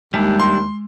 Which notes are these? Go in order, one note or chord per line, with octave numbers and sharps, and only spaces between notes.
D#2 G3 G#3 D4 E4
C6